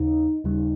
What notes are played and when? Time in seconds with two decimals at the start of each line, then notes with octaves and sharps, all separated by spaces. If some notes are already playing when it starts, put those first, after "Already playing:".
Already playing: D#2 C#3 D#4
0.44 D#2 C#3 G3